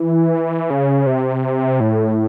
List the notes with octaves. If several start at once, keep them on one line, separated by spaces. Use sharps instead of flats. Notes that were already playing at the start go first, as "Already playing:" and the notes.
Already playing: E3
C#3
C3
A2